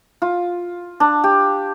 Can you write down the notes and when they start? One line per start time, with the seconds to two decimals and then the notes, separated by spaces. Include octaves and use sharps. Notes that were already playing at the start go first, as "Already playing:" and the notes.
0.22 F4
1.00 D4
1.24 G4